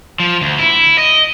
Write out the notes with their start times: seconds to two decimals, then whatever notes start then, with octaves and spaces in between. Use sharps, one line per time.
0.20 F3
0.41 D2
0.59 E4
0.98 D#5